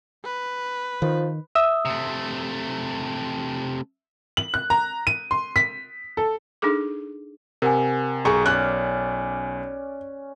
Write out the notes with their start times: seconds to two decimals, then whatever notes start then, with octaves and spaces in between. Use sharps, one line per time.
0.25 B4
1.02 D#3 F3
1.55 E5 D#6 E6
1.85 C3 A3
4.37 F#7
4.54 F#6
4.70 A#5
5.07 D#7
5.31 C6
5.56 B6
6.17 A4
6.62 D4 D#4 G#4 A4 D6
7.62 C3 A#4 F#5 G#5
8.25 B1 G#4 A#5 C#6
8.46 C#4 D5 F#6